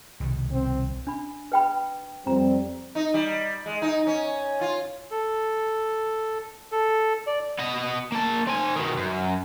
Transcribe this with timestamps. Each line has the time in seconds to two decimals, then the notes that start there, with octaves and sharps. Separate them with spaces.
0.20 C2 B2 D#3
0.52 C4
1.07 D4 B5
1.52 B4 G5 B5
2.27 F2 G3 C4 A#5
2.95 D#4
3.14 G3
3.66 G#3
3.82 D#4
4.07 C#4
4.61 F4
5.11 A4
6.72 A4
7.27 D5
7.58 B3 D#5
8.12 A#3 A5
8.47 C4 G#5
8.76 B2 D#3
8.97 F#2